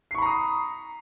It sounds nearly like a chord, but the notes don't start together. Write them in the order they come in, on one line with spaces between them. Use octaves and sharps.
C7 C#6 B5 A#5 D#6